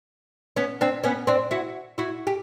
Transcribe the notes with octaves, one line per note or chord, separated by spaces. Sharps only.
B3 C#4
C4 D4
B3 C#4
C4 D4
E4 F#4
E4 F#4
G4